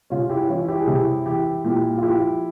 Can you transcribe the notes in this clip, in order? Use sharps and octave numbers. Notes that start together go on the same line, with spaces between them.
C3 C#4 F4
E4 G4
E3 C#4 F4
E4 G4
G#4
C3 E4 G4
E3 E4 G4
A#2 E4 G4
F4
F3 E4 G4